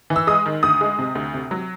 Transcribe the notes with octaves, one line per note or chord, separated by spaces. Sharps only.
E3
E6
G#3 D#6
D#3
D2 D#6
G#3
C3
D2
C3
F#3